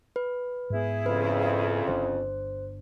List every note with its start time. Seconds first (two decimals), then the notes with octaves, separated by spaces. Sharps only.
0.16 B4
0.70 G#2 B3 E4 G#4
1.06 F2 C#3 B4
1.87 G1 D3 D4 C5